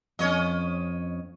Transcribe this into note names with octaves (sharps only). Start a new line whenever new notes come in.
F2 C#4 C#5 D#5